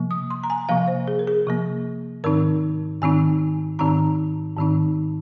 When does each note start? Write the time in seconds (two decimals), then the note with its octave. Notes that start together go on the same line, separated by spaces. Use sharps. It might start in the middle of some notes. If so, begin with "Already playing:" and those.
Already playing: C3 F3 A#3
0.11 D#6
0.30 C6
0.43 A#5
0.50 G#5
0.69 C3 F3 A#3 F5
0.88 C5
1.08 G#4
1.19 A#4
1.28 G#4
1.47 C3 F3 A#3
2.24 G#2 D#3 C4 D#4 A#4
3.01 G#2 D#3 C4 D#4 G#5
3.79 G#2 D#3 C4 D#4 A#5
4.57 G#2 D#3 C4 D#4